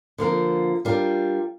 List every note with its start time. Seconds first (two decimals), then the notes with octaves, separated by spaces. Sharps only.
0.18 D3 F3 A#3 F4 A#4
0.85 G3 D4 F4 A#4